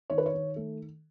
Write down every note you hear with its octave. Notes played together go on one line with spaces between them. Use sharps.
D#3 C#5
B4
C#5
D#3
A3